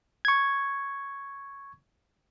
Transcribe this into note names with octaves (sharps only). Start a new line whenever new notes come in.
C#6 G#6